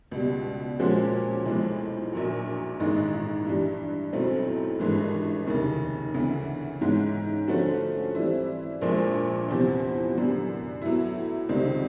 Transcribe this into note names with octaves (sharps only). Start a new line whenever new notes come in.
C#2 B2 G3
A#2 F3 G#3 C#4 F#4
B1 A2 F3 G#3
A#1 A#2 F#3
A1 G#2 D#3 G#3
G2 E3 G3
B1 A2 F#3 A3 C4
G#1 G2 E3 G#3
F1 D#2 C#3
D2 C#3 E3
G#2 E3 G#3 C#4
D3 F3 A3 C#4 F#4
E3 G3 C4 E4
A#1 A#2 F3 G#3
E2 C3 F3
F#2 D3 G3 B3
A2 F#3 B3 E4
C#2 C3 D#3 G3 C4